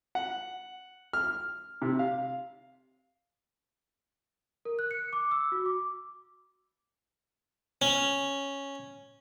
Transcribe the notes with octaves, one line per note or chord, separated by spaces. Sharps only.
F#5
F6
C3
F5
A#4
F#6
C#7
D6
E6
F#4
D6
C#4